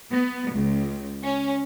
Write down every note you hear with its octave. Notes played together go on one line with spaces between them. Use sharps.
B3
C#2
C#4